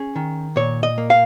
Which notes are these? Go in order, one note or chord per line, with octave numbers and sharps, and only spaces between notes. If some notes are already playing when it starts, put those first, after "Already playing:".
Already playing: C#4 G#4
D#3
A#2 C#5
D#5
A#3
F5